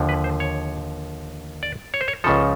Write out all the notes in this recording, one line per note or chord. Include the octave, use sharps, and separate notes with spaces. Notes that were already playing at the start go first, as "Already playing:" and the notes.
Already playing: D#2 D3 F3
B4
C5
C#5
D5
C#5
C5
C#5
C#2 C#3 F3 A4